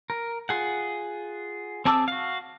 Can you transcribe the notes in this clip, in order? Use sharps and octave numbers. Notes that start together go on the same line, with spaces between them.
A#4
F4 G#4 F#5
C4 G#4 A5 D6 E6
F#4 F5